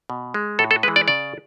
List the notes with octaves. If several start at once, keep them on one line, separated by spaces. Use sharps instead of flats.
B2
G#3
A2 A4
A4
E3 G#3 B4
D5
C#3 D5